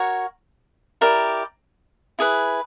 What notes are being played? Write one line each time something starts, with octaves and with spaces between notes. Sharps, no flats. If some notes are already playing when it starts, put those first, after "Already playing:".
Already playing: F#4 A#4 C#5
E4 G4 A#4 D5
E4 G#4 B4